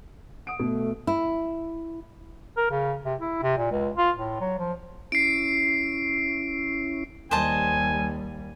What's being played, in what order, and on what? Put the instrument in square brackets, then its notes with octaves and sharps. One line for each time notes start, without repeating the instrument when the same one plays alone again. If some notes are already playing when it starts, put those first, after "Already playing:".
[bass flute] F#5 [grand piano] D#6 D7
[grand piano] B2 [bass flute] A3
[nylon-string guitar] E4
[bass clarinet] A#4
C#3
C3
E4
C3
A#2
C#2
F4
A2
F#3
F3
[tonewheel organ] C#4 E4 [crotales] C7 D7
[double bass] D#2 G3 [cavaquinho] C5 D#5 A5 [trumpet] G#5